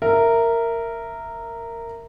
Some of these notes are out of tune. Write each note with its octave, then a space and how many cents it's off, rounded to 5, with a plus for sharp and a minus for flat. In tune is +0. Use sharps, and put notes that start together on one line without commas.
A#4 -10 E5 +0